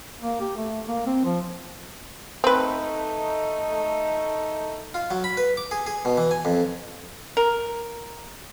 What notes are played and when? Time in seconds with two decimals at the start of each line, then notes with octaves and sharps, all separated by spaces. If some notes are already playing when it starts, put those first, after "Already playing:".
0.21 A#3
0.40 G4
0.57 A3
0.88 A#3
1.07 C4
1.25 F3
2.44 A3 C4 D#4 B4
4.94 F4
5.11 F#3
5.24 B5
5.37 B4
5.57 D6
5.71 G#4
5.87 G#4
6.05 B2
6.17 E3
6.31 G#5
6.45 F2
7.37 A#4